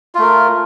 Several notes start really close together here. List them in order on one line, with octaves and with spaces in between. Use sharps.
F4 A3 A#4